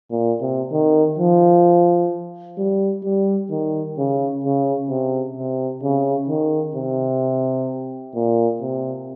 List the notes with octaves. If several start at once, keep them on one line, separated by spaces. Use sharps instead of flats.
A#2
C3
D#3
F3
G3
G3
D#3
C#3
C#3
C3
C3
C#3
D#3
C3
A#2
C3